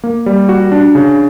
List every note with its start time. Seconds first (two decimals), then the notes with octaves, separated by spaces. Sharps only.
0.04 A#3
0.26 G3
0.49 F#4
0.72 D4
0.95 C#3